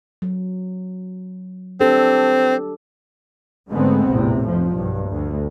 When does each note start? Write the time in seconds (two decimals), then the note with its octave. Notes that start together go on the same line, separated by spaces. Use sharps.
0.22 F#3
1.81 C4 D4 G4 A4
3.71 G#2 D3 G#3 A3 B3 C4
4.08 A#1 E2 A2 C3
4.45 F1 F2 F3
4.74 B1 G2
5.07 D2